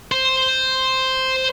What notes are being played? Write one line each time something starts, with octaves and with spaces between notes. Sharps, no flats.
C5